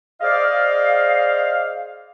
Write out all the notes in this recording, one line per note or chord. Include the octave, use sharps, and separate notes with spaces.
G#4 C5 D5 D#5 F5